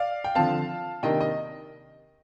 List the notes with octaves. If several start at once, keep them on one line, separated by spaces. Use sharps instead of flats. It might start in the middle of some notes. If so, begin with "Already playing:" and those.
Already playing: D5 F5
G5
D3 F3 C4 F5 A5
C3 D#3 A#3 D4 D#5 G5
D#5